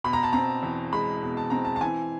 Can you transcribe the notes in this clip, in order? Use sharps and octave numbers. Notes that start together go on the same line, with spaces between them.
B2 B5
A#5
A5
C4 A#5
E2
G#3 B5
B2
A5
C4 A#5
A5
A5
E3 G#5